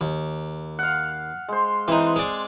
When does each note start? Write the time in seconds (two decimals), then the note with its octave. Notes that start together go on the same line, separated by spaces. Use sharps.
0.01 D#2
0.79 F5 F#5
1.48 G#3 C5
1.88 E3 C4 D#4
2.16 G#3 D5